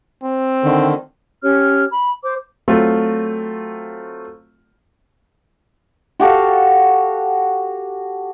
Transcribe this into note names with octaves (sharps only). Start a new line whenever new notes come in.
C4
D3 D#3
C#4 G4 C#5 F6
B5
C5 D6
F#3 A3 C4 F4
F#4 G4 A4 F5